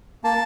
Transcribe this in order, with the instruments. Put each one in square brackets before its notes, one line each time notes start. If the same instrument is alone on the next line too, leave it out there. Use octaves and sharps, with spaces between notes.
[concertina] A#3 A5